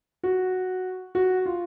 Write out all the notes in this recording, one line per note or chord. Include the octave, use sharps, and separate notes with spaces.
F#4
F#4
F4